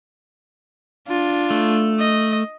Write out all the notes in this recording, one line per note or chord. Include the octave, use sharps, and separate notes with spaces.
D4 F4
A3
D#5